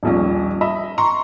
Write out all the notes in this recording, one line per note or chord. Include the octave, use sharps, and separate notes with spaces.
D#1 A#1 C#4
D#5 E5 B5
A#5 C6 C#6